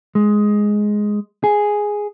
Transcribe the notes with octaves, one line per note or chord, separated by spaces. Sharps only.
G#3
G#4